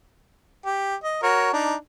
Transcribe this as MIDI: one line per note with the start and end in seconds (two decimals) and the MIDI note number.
0.66 0.95 67
1.04 1.22 75
1.23 1.51 66
1.23 1.51 70
1.23 1.51 73
1.53 1.75 62
1.53 1.75 63